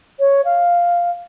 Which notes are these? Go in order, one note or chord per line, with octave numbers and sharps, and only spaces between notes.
C#5
F5